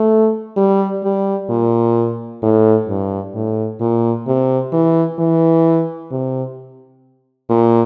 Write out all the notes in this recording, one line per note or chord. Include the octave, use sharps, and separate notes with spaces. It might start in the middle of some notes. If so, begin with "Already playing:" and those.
Already playing: A3
G3
G3
A#2
A2
G2
A2
A#2
C3
E3
E3
C3
A#2